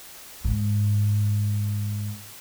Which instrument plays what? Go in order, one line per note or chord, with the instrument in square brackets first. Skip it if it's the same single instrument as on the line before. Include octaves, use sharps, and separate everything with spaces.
[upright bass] G#2